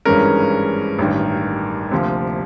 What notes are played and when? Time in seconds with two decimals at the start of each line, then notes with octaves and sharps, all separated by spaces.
0.05 G#1 G2 E3 G#3 C#4 A#4
0.99 A1 G2 D#3
1.91 D2 C3 F3 A#3